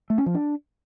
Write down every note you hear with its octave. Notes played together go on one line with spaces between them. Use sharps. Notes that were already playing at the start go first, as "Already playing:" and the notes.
A3
C#4
F3
D4